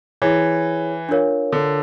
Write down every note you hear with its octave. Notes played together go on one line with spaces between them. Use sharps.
E3 E4 G#4 C#5
D4 F4 A#4 C#5 F5
D3